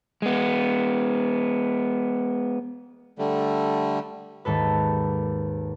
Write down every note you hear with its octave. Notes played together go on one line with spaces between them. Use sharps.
G#3 B3
D3 G3 A3
D#2 G#2 A4 B4